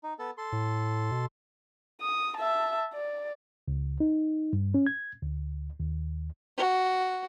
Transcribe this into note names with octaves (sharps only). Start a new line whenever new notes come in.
D#4
B3 A4
A4 C6
A2
B2
D#6
E5 A5
D5
C#2
D#4
G2
C#4
G#6
D2
D#2
F#4